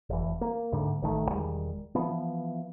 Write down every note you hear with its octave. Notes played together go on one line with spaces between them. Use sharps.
F1 E3
A#3
D2 G#2 D3
A1 D#3 A3
E1 D#3 G3 G#3
E3 F3 B3